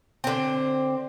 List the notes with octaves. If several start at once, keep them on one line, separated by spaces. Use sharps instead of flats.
D3 C4